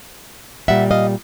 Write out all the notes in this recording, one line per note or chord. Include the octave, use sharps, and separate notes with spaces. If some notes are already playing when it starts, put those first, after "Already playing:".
A#2 G3 E5 F#5
D#5 F5